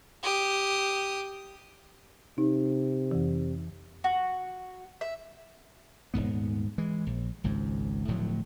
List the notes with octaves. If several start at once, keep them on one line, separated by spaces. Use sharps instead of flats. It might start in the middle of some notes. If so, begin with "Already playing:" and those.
G4 D#6
C3 D#4
F2 E3
F#4
E5
D#1 F2 G#2 B3
E3 G#3
A#1
G#1 C#2 G#2
D1 A2 F3 F#3